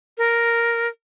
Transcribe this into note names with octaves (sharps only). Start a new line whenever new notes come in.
A#4